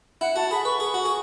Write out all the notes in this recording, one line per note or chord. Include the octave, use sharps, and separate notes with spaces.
E4 F#5
F#4 A5
G#4 B5
B4 C#6
G#4
F#4
G#4